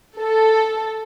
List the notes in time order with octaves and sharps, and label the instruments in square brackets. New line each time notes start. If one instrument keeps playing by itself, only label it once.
[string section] A4